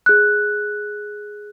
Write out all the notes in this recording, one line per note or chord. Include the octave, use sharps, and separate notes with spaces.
G#4 F#6